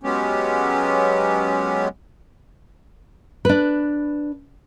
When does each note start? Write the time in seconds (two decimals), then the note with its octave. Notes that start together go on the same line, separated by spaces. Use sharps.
0.03 F#3 G#3 B3 C#4 G4
3.45 D4 B4